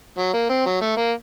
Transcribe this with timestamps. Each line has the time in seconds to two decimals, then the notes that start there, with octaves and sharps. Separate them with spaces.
0.18 F#3
0.33 A#3
0.49 C4
0.66 F#3
0.81 A3
0.97 A#3